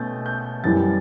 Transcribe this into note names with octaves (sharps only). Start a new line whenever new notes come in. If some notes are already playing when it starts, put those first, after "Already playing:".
Already playing: B2 A3 C#4 G6 A6
G6
F#2 E3 G3 C#4 A6